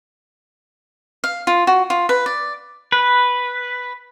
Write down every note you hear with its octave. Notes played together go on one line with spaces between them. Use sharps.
F5
F4
F#4
F4
B4
D5
B4